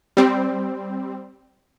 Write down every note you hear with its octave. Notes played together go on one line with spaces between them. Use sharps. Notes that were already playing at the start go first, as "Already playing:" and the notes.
G3 C4